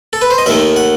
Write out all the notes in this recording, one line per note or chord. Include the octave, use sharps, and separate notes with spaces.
A4
B4
C5
D#5
D#2 D#3 A3 E5
F#5